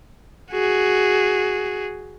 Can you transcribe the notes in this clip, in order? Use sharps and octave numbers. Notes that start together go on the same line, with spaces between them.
F#4 G#4